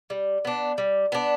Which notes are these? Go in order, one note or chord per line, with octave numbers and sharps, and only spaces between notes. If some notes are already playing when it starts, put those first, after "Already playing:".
G3
B3 D4
G3
B3 D4